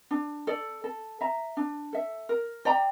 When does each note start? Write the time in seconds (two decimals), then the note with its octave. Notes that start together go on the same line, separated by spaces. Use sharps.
0.11 D4
0.47 A4 D5
0.84 A4
1.21 E5 A#5
1.57 D4
1.93 A4 E5
2.29 A#4
2.65 D5 G5 A#5